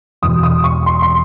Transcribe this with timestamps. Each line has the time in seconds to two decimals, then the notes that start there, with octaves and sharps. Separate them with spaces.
0.22 E1 E2 B2 D#6
0.43 D#6
0.64 C#6
0.86 C6
1.02 C6